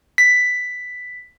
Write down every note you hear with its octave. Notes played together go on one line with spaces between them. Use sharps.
B6